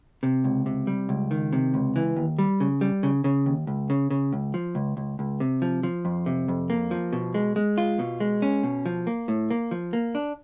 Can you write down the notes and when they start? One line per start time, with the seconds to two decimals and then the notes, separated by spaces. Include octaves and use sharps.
0.23 C3
0.44 C#2
0.66 C3
0.87 G3
1.09 C#2
1.31 D#3
1.53 C3
1.74 C#2
1.96 E3
2.16 D#2
2.38 G3
2.60 C#3
2.81 G3
3.03 C#3
3.24 C#3
3.46 D#2
3.67 C#2
3.90 C#3
4.10 C#3
4.33 C#2
4.54 F3
4.75 C#2
4.97 C#2
5.19 C#2
5.40 C3
5.62 F3
5.83 F3
6.05 F2
6.26 C3
6.48 F2
6.70 A#3
6.91 F3
7.13 B2
7.34 G#3
7.56 G#3
7.78 F4
7.99 B2
8.20 G#3
8.42 C#4
8.63 B2
8.86 F3
9.07 A#3
9.28 A2
9.51 A#3
9.71 F3
9.93 A#3
10.15 D4